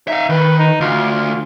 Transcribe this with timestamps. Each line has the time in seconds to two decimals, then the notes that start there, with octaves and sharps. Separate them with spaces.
0.08 D#4 E5 F5
0.29 D#3 B4
0.59 D#4
0.80 D2 F4
1.11 F4